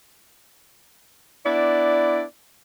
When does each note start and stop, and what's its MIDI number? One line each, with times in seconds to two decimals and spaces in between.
1.46 2.22 59
1.46 2.22 62
1.46 2.22 64
1.46 2.22 74